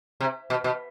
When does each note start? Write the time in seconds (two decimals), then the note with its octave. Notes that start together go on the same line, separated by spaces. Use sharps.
0.21 C3
0.50 B2
0.64 B2